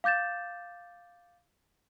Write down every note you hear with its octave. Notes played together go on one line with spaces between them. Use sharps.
F5 D6 G6 A6 E7